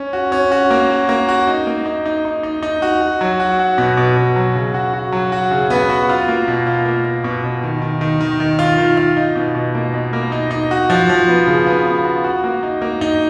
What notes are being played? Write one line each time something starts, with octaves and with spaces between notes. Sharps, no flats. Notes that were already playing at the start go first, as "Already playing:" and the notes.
Already playing: C#4
F#4
C#4
F#4
A#3
F#4
A#3
F#4
D#4
A#3
D#4
D#4
D#4
D#4
D#4
F#4
F#4
F#3
F#4
F#4
B2
B2
B2
F#3
C#3
F#4
F#4
F#3
F#4
C#3
B3
F#4
F4
A#3
B2
F4
A#3
F4
B2
B2
D#3
D#3
D#3
D#3
D#3
F4
D#3
F4
D#4
B2
B2
A#3
B2
A#3
D#4
D#4
F#4
F3
F3
B3
C#3
B3
B3
F#4
F#4
A#3
D#4
A#3
D#4